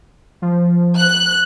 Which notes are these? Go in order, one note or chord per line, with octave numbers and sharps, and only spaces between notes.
F3
F#6